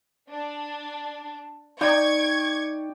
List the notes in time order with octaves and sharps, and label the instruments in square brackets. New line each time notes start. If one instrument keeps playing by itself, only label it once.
[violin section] D4
[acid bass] D#4 [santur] D5 G5 [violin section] C#6 G#6